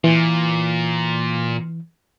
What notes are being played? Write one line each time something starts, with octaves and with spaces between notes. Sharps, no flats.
A#2 E3